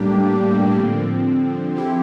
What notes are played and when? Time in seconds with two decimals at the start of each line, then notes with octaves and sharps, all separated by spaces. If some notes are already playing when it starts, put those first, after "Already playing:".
Already playing: A2 G3 A#3 D4 G4
0.75 D3 F3 C4
1.75 F3 C4 E4 G4